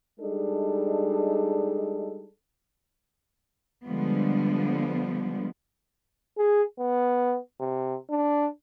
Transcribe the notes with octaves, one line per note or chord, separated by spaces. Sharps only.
G3 G#3 D4 D#4 G#4 A4
D3 F3 G3 G#3 B3
G#4
B3
C3
D4